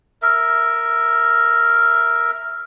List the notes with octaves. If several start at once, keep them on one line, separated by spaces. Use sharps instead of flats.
A#4 E5